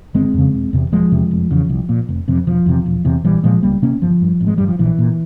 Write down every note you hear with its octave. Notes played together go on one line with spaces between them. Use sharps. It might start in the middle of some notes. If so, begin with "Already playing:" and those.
G1 G#3 C4
F2 C#3
E1
E2 C3
E1 F3 G#3
E2 C3
F1
E2 C#3
C2
A#2
F1
F2 C3
E1 F3
E2 C3
E1
E2 C3
A#1 E3 G3
A#2 F3 G#3
C#2 G3 A#3
C3 A#3 C#4
G1 F3
G2
G#1
G#3
G2 G3
F3
A#1 E3
A#2